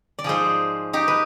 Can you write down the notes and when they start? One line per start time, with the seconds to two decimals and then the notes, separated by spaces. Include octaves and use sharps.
0.19 D5
0.24 G#2 F3 G#4 C5
0.93 D#4 G4
1.08 B4